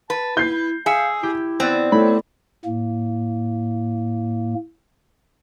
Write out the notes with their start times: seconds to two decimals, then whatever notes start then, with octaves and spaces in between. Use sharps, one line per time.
0.10 B4 A5
0.37 E4 G6 C7
0.86 G#4 E5 F5 E6 C#7
1.23 E4 G4
1.60 B3 C4 B4 D5
1.92 A3 E4 C#5 B5
2.65 A2 A#3